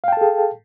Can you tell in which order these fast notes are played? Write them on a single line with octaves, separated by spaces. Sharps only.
F5 G5 A5 A4 G#4